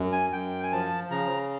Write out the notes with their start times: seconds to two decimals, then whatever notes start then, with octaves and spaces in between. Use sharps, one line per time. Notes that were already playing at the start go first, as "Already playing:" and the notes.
Already playing: F#2
0.12 G#5
0.32 F#2 G5
0.63 G#5
0.72 F3 A5
1.11 C#3 A#5